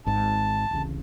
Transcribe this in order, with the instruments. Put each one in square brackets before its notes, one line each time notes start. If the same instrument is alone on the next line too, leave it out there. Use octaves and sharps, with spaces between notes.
[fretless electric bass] G#1 G#2 [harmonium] A5
[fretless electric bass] D1 A1 C#3